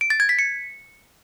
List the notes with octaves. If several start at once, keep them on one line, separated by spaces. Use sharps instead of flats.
D7
A6
G#6
B6
C#7